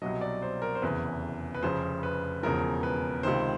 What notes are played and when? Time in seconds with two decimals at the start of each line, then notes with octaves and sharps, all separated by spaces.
0.02 C2 B2 F#3 D#5
0.21 D5
0.42 C5
0.62 A#4
0.75 C5
0.82 F1 E2 C#3 E3 B4
1.55 B4
1.63 F1 F2 C#3 F3 C5
2.03 B4
2.43 E1 E2 C#3 F3 A#4
2.83 B4
3.23 C#2 C3 D#3 C5